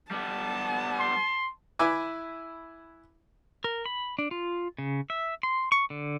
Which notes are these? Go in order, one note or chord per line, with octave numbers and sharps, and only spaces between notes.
G3 B3 A5
C6
E4 B4 E5 G#5 D6
A#4
B5
D4
F4
C#3
E5
C6
C#6
D3